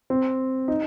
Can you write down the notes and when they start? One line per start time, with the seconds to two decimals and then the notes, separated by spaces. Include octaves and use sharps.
0.10 C4
0.68 D#4